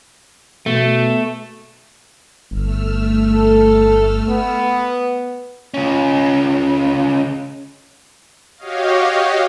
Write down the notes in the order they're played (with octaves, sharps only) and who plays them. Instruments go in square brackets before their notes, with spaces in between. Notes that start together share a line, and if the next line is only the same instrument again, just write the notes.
[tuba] B2 [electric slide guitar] A3
[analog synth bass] G1 [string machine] A3 E6 F6
[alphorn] A4
B3
[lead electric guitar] C#2 C#4
[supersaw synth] F#4 G4 C#5 D#5 F5